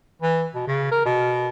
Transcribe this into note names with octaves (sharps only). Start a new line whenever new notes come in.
E3
B2
C#3
A#4
B2